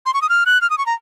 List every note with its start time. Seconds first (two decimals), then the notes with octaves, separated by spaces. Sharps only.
0.06 C6
0.14 C#6
0.22 D#6
0.29 F6
0.46 F#6
0.62 F6
0.70 D#6
0.78 C#6
0.86 A#5